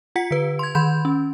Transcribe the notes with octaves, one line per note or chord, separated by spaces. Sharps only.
F4 F#5 B6 C#7
D3 B4
C6 G#6
D#3 B5 C6 G6
C#4